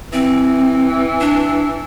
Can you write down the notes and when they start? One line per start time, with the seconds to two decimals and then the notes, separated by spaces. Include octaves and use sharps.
0.13 E3 C4
1.21 D4